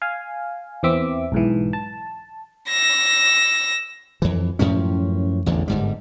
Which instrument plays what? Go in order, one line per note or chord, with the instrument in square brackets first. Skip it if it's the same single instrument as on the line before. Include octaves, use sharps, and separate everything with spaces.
[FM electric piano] F5 G#5
E2 E3 C4 E5 D6
B1 G#2 E3
A5
[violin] E6 A#6
[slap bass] F2 E3
F#2 A2 F3 C#4
A1 E2 D3
G1 G#2 G3